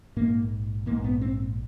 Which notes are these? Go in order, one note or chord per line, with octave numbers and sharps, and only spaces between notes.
A#1 G#2 A#3
A#1 G#2 A#3
B3
C4